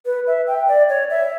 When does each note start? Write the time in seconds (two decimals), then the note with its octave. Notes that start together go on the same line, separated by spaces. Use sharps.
0.06 B4
0.27 E5
0.47 G5
0.68 D5
0.89 C#5
1.10 E5